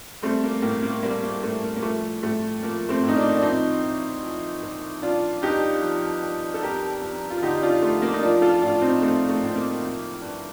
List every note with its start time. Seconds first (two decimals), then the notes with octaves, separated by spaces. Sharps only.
0.22 G3 A3 C4
0.43 A#3
0.62 A2 A#3
0.83 A#3
1.03 G3 A#3
1.22 A#3
1.43 A2 A3
1.63 A#3
1.76 A#3
1.82 F3 A3
2.23 A2 A3
2.62 F3 A#3
2.89 A3 C4
3.03 A2
3.08 D#4
3.16 A#3 D4
3.37 D4
3.42 F3 C4 D#4
3.82 A#2
4.22 F3
4.62 A#2
5.02 F3 D4 F4
5.42 G2 D#4 G4
5.82 F3
6.22 G2
6.54 A4
6.62 F2 G4 A#4
7.02 F2
7.30 F4
7.42 D3 D#4 G4
7.62 D4 F4
7.82 F3 A3
8.02 A#3
8.14 D#4
8.22 F3 D4 F4
8.42 F4 A4
8.62 A2 D4 F4
8.81 C4 D#4
9.02 F3 A3 C4
9.29 A3
9.41 A2
9.47 C4
9.55 A#3
9.82 F3
10.22 G2